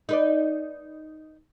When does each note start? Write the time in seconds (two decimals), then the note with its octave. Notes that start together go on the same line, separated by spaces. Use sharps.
0.09 D#4 B4 D5